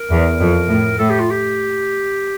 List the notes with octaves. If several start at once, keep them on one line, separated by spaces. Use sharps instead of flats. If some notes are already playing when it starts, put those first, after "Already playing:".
Already playing: A#4
E2
F2
A2
A2 A4
G4
F4
G4